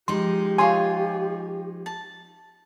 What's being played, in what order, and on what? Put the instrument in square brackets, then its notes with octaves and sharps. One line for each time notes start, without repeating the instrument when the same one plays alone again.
[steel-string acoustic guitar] F3 G#3 D#4 [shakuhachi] G4 [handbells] C6
[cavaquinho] F4 G#4 C#5 [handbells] G#5 C6
[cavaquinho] A5